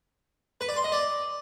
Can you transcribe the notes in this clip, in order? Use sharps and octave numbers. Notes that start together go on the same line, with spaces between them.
B4
D5
C6
D#5
D5